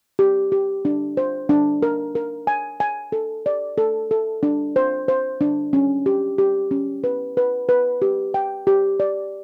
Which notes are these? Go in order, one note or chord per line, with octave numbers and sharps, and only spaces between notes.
G4
G4
D4
C5
D4
A#4
A#4
G#5
G#5
A4
D5
A4
A4
D4
C5
C5
D4
C#4
G4
G4
C#4
B4
B4
B4
G4
G5
G4
D5